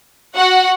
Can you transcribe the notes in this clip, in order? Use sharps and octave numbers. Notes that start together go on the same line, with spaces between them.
F#4 F#5